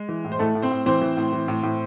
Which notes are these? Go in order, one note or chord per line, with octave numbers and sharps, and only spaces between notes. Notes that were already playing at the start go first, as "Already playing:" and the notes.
Already playing: G#3
E3
A2
C5
A2 A3 A4
A2
C4 C5
A2
E3 C4 C5
E3
A2
E3
A2
A2